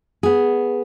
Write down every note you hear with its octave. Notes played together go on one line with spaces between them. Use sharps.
B3 G#4